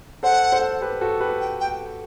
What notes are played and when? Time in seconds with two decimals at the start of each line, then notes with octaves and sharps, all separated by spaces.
0.23 A4 C5 F#5
0.52 A4 C5
0.81 G4 B4
1.01 F#4 A4
1.21 G4 B4
1.41 G5
1.60 G5